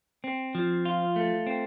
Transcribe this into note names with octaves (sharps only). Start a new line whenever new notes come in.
C4
F3
F4
A3
C4